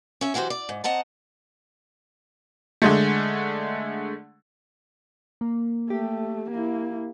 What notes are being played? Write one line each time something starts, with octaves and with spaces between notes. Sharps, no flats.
C#4 E5
E3 F#3 F#4 G4 C5
D5
G#2
C4 D#5 F#5 A5 A#5
D3 G#3 A3
A#3
A3 G4
A#3 E4